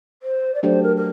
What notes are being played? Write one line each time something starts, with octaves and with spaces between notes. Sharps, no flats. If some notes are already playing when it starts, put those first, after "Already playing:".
C5
D5
F#3 A3 D4 G4 C5
A#4
A#4